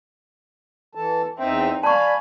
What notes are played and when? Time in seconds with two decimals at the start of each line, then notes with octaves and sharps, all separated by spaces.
0.95 E3 A4 A5
1.39 E2 C4 D#4 E5 G5
1.83 D5 F5 G#5 A5 B5 C#6